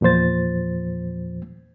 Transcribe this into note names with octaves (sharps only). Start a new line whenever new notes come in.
E2 A#2 F3 C5 A6